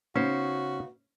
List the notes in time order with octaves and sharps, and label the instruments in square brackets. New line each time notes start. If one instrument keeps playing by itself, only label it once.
[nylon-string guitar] C#3 B3 D#4 [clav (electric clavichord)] C#4 C5 [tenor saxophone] F#4